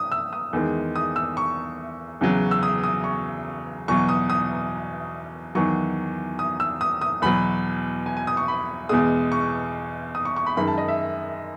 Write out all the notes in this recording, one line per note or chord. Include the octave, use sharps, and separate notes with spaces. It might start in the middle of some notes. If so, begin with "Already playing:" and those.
Already playing: D#6
E6
D#6
E2 D#3 G#3
D#6
E6
C#6
E2 C#3 F#3
E6
D#6
D#6
C#6
E2 B2 F#3 C#6
D#6
D#6
E2 D#3 F#3 C#6
D#6
E6
D#6
D#6
E2 B2 F#3 B5
G#5
G#5
D#6
C#6
B5
E2 B2 G#3 D#6
C#6
D#6
C#6
C#6
B5
F#2 D#3 G#3 B5
A5
D#5
E5